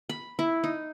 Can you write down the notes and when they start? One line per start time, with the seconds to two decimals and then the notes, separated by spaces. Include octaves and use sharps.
0.09 B5
0.39 E4
0.64 D#4